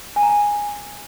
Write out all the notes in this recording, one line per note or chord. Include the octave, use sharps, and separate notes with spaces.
G#5
A#5
G#5